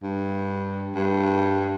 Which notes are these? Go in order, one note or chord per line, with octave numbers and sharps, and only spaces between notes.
G2
G2